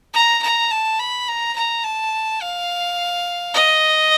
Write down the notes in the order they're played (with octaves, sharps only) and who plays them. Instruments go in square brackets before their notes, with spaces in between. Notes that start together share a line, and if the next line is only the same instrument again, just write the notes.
[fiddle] A#5
A#5
A5
B5
A#5
A#5
A5
F5
D#5